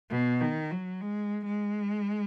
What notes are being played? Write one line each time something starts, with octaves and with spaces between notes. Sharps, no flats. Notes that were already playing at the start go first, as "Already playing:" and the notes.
B2
D#3
F#3
G#3
G#3